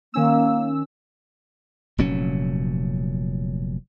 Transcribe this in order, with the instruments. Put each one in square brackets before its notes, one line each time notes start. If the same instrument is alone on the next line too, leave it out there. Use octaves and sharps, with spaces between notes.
[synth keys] D#3 C#4 E6 [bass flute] A#3
[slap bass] F1 A#2 F#3 C#4